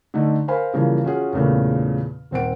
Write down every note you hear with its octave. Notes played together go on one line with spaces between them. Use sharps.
D3 A3 D#4
A#4 C5 F5 G#5 B5
C#3 E3 F3 G3 A#3
C#4 F4 F#4 G#4
E2 A#2 C#3 A3
D#1 C4 F#5 D7